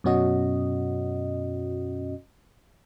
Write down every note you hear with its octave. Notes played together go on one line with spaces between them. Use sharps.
F#2 B2 C#4 F#4 D#5